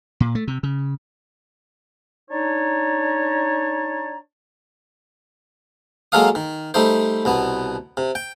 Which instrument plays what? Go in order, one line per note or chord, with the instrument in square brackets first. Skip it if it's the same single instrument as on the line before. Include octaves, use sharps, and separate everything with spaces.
[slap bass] A#2
A3
C3
C#3
[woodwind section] D4 D#4 C#5 A5 A#5
[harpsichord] F#3 G#3 A#3 A4 F5 D#6
D#3
G3 A3 D#4 C5
C2 B2 B3
C3
G5